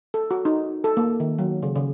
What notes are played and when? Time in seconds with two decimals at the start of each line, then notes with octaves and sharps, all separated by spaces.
0.14 A4
0.31 F#4
0.45 D#4
0.84 A4
0.97 A#3
1.20 D#3
1.39 F#3
1.63 C#3
1.76 C#3